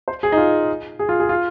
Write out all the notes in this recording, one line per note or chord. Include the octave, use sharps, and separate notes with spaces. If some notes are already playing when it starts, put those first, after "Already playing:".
C5
G#4
D#4
F4
G#4
F4
G#4
F4